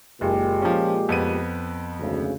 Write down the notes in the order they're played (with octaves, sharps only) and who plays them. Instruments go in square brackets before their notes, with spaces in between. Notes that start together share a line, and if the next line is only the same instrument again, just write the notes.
[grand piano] F#1 [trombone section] A#2 G#3 G4
[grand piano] F3 C#4
F2 B3 D#7
[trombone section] G#1 D2 C#3